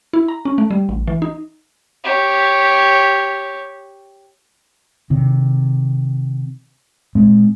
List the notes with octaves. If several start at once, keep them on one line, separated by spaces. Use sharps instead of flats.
E4
A#5
C#4
A3
G3
A1
E3
D#4
G4 C#5
C3 D#3
A#2 G#3 C4